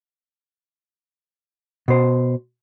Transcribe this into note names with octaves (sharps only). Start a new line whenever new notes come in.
B2 C5